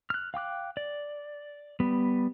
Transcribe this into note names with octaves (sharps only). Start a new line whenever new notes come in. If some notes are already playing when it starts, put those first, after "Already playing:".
F6 F#6
F5 G5 D6 F#6
D5
G3 B3